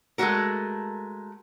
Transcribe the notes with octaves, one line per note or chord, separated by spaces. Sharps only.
G#3 A3 B3 C#4 F#4 A#4